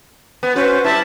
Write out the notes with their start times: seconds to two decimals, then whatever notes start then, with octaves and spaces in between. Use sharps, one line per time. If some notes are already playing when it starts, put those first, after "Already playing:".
0.43 B3
0.56 C#4 F#4 B4 C5
0.85 G3 E4 E5 A5